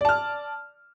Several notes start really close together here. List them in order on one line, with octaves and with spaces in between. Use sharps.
D5 A5 F6